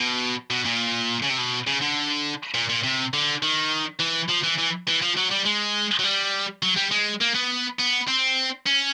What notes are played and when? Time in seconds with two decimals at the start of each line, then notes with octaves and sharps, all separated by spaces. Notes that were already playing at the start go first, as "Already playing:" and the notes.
Already playing: B2
0.51 B2
0.65 A#2
1.23 C#3
1.30 C3
1.38 B2
1.67 C#3
1.82 D3
2.54 A#2
2.69 A#2
2.83 C3
3.13 D3
3.43 D#3
4.00 E3
4.29 F3
4.44 E3
4.58 E3
4.88 E3
5.02 F3
5.17 F#3
5.31 G3
5.46 G#3
5.99 F#3
6.04 G3
6.63 F#3
6.77 G3
6.91 G#3
7.21 A#3
7.35 B3
7.79 B3
8.08 C4
8.66 C#4